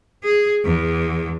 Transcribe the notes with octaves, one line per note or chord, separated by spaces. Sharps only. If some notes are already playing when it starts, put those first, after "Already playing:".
G#4
E2